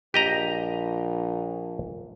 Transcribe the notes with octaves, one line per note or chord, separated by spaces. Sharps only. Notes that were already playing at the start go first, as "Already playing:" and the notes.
A#1 G4 D#5 A#5